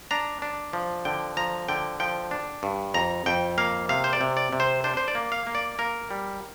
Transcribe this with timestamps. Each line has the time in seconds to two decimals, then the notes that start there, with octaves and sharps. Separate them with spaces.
0.11 D4 A#5
0.42 D4
0.73 F3
1.05 D3 G5
1.37 F3 A#5
1.69 D3 G5
2.00 F3 G5
2.31 D4
2.63 G2
2.94 F2 A#5
3.26 F2 G5
3.58 A#3 F5
3.89 C3 F5
4.04 C5
4.13 D5
4.21 C3
4.37 D5
4.53 C3
4.60 C5
4.84 D4 C5
4.97 C5
5.08 D5
5.15 A#3
5.32 F5
5.47 A#3
5.55 D5
5.79 A#3 A#4
6.11 G3